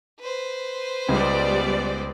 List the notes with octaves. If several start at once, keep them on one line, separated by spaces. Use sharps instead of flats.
B4 C5
C#2 G3 B3 D5